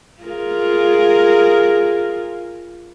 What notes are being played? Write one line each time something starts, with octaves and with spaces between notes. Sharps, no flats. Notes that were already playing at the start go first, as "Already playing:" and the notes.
F4 G#4 A#4